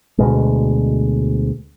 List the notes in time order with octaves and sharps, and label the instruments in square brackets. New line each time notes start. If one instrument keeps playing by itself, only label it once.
[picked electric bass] D2 B2 G#3